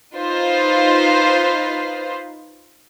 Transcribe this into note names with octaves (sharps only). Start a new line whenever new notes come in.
D#4 F4 B4 C5